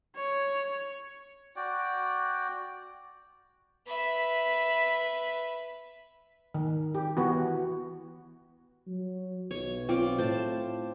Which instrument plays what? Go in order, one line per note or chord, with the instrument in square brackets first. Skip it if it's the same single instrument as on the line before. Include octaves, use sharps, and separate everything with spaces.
[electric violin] C#5
[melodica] F#4 D5 G5
[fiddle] B4 E5
[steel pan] D#3
G4
E3 B3 F#4
[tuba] F#3
[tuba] B1 [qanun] C#5
[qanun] C4 F4 D6
[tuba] A2 [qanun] C5 A5